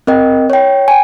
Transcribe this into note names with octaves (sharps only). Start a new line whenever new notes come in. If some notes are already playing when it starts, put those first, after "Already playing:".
C4 A#4 D#5 G5
C#5 G5
G5 G#5